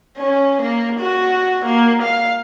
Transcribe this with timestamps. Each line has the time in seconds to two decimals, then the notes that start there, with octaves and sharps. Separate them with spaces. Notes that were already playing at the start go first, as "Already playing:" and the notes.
0.17 C#4
0.62 A#3
1.00 F#4
1.65 A#3
2.03 F5